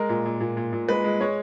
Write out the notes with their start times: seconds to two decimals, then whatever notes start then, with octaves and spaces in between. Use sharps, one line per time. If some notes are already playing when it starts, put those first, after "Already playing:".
Already playing: G#3 A#4
0.09 A#2
0.26 A#2
0.40 A#2
0.57 A#2
0.73 A#2
0.88 G#3 B4
1.04 G#3
1.21 G#3 C#5